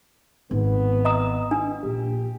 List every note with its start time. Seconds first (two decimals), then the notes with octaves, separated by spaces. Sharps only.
0.51 G#1 B3
1.05 D#5 A#5 D#6
1.51 D4
1.83 A#1 G4